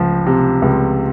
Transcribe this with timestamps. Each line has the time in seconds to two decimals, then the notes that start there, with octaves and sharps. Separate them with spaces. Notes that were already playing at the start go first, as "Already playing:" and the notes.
Already playing: C#2 F3
0.27 C3
0.62 C#2